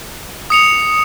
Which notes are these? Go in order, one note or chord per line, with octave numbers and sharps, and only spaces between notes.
D#6 C#7 F7